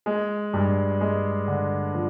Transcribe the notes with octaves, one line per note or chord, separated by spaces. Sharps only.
G#3
G2
G#3
D3
F3